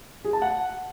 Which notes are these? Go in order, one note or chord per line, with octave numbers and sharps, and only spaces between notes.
G#4
A5
F#5